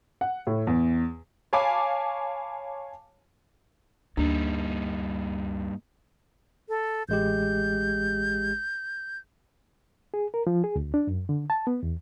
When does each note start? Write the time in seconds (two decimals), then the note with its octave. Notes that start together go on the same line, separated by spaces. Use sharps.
0.21 F#5
0.47 A2
0.67 E2
1.53 C#5 F5 G#5 A5 B5 D6
4.17 D2 G2 G3 A#3 D4 D#4
6.69 A4
7.09 A1 G#3 G4 G6
10.14 G#4
10.34 A#4
10.47 F3
10.64 G#4
10.76 D2
10.94 D4
11.07 F#2
11.29 D3
11.50 A5
11.67 B3
11.83 E2